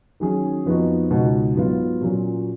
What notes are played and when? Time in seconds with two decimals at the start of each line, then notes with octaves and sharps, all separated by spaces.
0.20 D#3 F#3 C#4 G#4
0.66 F2 F3 B3 D#4 F#4
1.10 C#2 B2 G#3 D#4 F#4
1.55 G#2 F#3 B3 F4
2.01 A#2 F#3 C#4